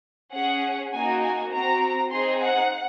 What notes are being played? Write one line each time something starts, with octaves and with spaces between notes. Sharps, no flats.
C#4 G#4 F#5
A#3 D#4 F#4 G#5
G#5
C4 F#4 A#5
C4 D#4 G#4 C6
F#5